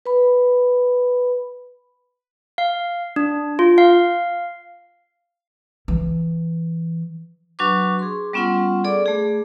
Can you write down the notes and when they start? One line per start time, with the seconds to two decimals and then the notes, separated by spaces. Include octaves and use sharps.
0.06 B4 B5
2.58 F5
3.16 D4
3.59 F4
3.78 F5
5.88 E3
7.59 F#3 D4 F#4 B4 C#6 D6
7.99 G#4 C6
8.33 G3 B3 C#4 F4 F#5 C6
8.84 G#4 A4 D5 D6
9.06 A3 G#4